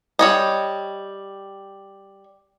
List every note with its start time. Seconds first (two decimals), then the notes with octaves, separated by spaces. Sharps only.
0.19 G3 C#5 D#5